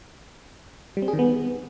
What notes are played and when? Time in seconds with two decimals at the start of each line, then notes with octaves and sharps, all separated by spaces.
0.97 G3
1.02 C4
1.08 G#4
1.13 D#3
1.19 B3